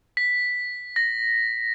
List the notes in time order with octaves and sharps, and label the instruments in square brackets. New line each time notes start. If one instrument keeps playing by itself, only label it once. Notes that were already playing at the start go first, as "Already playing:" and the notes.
[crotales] B6
A#6